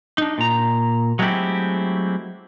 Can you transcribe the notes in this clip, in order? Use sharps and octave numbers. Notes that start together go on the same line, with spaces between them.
D4 D#4
A#2 A#5
F#3 G#3 A3 C4 E4 G4